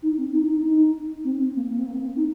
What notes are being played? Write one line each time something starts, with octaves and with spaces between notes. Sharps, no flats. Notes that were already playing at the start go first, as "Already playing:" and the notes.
D#4
C4
D#4
D#4
D#4
C4
C4
A#3
A#3
C4
A#3
C4
D#4